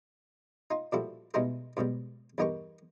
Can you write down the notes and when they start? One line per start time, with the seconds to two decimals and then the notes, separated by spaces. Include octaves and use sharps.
0.71 D#4 F4
0.92 A#2 F3 G3 E4 F#4 A4
1.34 B2 G3 G#3 D#4 E4 G#4
1.77 G#2 B2 F#3 G3
2.38 E2 G2 D#4 G4 A#4 C#6